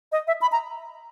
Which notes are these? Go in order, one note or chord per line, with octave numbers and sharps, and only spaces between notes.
D#5
E5
B5
A#5